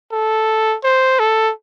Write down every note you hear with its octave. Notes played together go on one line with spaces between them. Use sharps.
A4
C5
A4